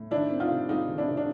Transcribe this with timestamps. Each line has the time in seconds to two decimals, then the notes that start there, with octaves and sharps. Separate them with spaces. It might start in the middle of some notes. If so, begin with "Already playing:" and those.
Already playing: A2
0.11 D#3 D4 E4
0.31 C4
0.40 D#4 F4
0.50 C3
0.69 G#3 D#4 F4
0.88 D#3
0.98 D4 E4
1.08 C3
1.17 D4